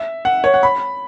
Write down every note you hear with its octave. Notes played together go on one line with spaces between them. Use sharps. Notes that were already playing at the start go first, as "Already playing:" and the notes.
Already playing: E5
F#5
C#5
F#5
B5